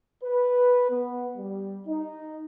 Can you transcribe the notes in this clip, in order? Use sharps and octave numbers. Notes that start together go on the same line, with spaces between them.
B4
B3
G3
D#4